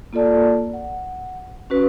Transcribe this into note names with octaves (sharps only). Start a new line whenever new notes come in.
A#3 F4 A4 D5 A5
F#5
C#4 F#4 B4